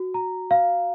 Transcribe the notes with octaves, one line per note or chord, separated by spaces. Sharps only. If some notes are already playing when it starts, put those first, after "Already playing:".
Already playing: F#4
A#5
F5